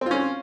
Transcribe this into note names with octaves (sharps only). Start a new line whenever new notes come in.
C4 C#4 F4